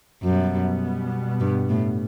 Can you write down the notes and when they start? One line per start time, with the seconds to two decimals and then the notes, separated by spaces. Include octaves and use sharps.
0.23 F#2 B2 G3 B3
1.41 G2
1.69 A2